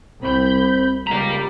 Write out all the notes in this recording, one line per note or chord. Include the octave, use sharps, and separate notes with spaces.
C2 C4 B5 G6
C#2 G3 F5 A#5 B6